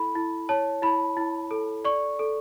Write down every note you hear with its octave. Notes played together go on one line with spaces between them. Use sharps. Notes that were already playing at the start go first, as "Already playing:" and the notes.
Already playing: E4 A4 B5
E4
C#5 A5
E4 B5
E4
A4
D5 C#6
A4